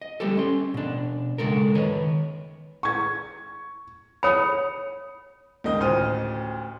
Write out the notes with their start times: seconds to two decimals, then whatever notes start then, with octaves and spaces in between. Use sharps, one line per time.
0.02 D#5
0.20 G3 A3 G4 A4
0.37 C#4 C6
0.74 B2 D4
1.38 C#3 G#3 A4 A#4
1.75 D#3 B4 C#5
2.83 C#6 G#6
4.23 C#5 B5 D#6 C#7
5.64 C#2 D#3 D#5 D#6
5.80 A1 D2 C5 F6 D#7